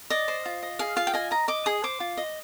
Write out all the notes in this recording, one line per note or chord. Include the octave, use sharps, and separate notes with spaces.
D5 D#5
C5
F4
D#5
G#4 F5
F4 F5
G5
D#5 G#5
D#5 A#5
D#5 D6
G#4 D#6
C5 D6
F4
D#5